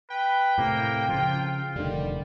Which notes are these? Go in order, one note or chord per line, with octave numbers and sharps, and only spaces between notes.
B4 G5
A2 C3 A#3
C#3 F3 F4
F1 D3 D#3 G3